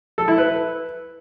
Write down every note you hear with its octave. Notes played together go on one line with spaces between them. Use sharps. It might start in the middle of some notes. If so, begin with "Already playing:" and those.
A4
E4
B4